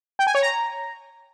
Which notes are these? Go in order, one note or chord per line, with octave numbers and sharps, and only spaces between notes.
G5
G#5
C#5
A#5